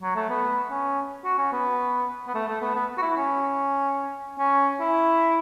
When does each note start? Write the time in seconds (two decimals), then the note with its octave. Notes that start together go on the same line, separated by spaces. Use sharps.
0.02 F#3
0.15 A3
0.30 B3
0.71 C#4
1.25 F#4
1.38 C#4
1.52 B3
2.27 B3
2.35 A3
2.48 A3
2.61 B3
2.75 B3
2.98 F#4
3.02 E4
3.17 C#4
4.39 C#4
4.80 E4